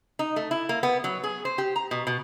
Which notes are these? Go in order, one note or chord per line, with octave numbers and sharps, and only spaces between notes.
D#4
A3
E4
A#3
B3
F#3
G#4
C5
G4
A#5
B2
B2